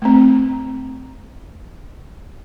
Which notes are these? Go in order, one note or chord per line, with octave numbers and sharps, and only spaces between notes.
A3 C4